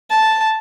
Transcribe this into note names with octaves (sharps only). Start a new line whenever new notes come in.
A5